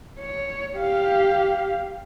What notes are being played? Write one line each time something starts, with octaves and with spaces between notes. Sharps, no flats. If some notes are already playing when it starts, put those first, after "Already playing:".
C#5
G4 F5